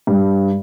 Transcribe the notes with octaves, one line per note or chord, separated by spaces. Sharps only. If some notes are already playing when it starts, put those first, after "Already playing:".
G2